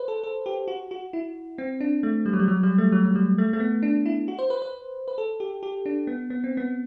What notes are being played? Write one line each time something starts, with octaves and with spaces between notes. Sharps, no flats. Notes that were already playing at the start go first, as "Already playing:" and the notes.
Already playing: B4 C5
A4
A4
G4
F#4
F#4
E4
C4
D4
A3
G3
F#3
G3
F#3
G3
A3
F#3
F#3
G3
A3
A3
B3
D4
E4
F#4
C5
B4
B4
B4
A4
G4
G4
D4
B3
B3
C4
B3